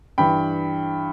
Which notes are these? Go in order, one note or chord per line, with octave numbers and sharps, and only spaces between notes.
G2 E3 G5 B5